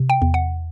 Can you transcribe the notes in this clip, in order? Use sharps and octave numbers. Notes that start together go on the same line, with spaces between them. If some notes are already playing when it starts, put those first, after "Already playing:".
Already playing: C3
G5
E2
F#5